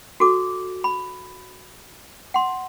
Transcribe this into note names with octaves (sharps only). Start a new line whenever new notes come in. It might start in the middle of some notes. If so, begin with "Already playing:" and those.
F#4 A4 D6
B5
F#5 C6